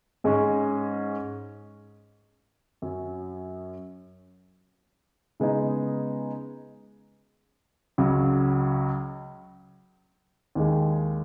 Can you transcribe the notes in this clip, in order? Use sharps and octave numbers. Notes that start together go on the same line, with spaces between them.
G#2 G#3 C#4
F#2 F#3 C#4
C#3 G#3 B3 D#4
C#2 C#3 F#3
D#2 D#3 G#3